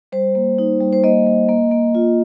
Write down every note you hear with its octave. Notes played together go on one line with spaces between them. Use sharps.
G3 C5
A#3
D#4
G3
C5
A#3 D#5
A#3
A#3
A#3
F4